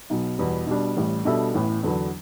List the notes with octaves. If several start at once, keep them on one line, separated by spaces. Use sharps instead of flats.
B1 B2 F#3
E2 B2 G3 B3
B2 G3 D4
A1 A2 G3
B2 G3 D4 A4 E5
A1 A2 E3 B3
E2 D3 F#3 B3 D4